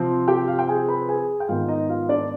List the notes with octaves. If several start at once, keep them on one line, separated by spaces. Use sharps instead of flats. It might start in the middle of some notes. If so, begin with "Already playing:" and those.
Already playing: C3 F3 C4
G4 G5
F5
G5
G#4 G#5
B4 B5
G#4 G#5
G5
G#2 D#3 B3 F4 F5
D#4 D#5
F4 F5
D4 D5